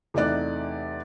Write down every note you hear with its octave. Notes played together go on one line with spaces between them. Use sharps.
E2 C3 A3 D#4 D5 F#6